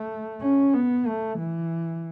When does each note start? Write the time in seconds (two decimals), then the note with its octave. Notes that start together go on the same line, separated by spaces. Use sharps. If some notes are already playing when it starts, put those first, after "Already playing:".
Already playing: A3
0.41 C#4
0.74 B3
1.06 A3
1.38 E3